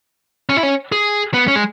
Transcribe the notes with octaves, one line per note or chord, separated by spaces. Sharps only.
C#4
E4
C#4
G#4
B3
C#4
G#3